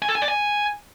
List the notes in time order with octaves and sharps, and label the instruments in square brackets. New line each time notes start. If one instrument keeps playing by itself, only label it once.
[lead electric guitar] G#5
A4
G#5
D5
G#5